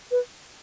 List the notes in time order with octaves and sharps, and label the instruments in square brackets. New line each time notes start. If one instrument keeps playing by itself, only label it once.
[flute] B4